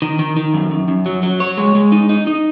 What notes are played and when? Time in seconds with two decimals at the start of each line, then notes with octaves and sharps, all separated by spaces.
0.02 D#3
0.19 D#3
0.37 D#3
0.54 F#2
0.71 F#2
0.88 F#2
1.06 F#3
1.23 F#3
1.40 C#5
1.57 G#3
1.75 G#3
1.92 D#4
2.09 D#4
2.27 D#4